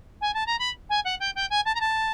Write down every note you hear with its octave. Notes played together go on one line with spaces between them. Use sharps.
G#5
A5
A#5
B5
G#5
F#5
G5
G5
G#5
A5
A#5
A5